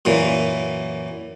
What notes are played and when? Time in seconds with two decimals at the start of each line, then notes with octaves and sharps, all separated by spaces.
0.05 F#2 A#2 E3